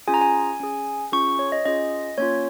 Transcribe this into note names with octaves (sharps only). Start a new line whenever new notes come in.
C#4 F4 G#4 G#5
A#5
G#5
C#4 G#4
C#4 F4 G#4 C#6
C#5
D#5
C#4 F4 G#4 D#5
A#3 C#4 F4 C#5